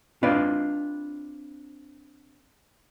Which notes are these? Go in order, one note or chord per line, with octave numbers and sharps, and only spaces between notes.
C4 D4 F4 B4 D5 D#5